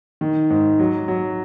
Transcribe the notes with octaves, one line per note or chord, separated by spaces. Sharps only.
D#3
G#2
F#3
F#3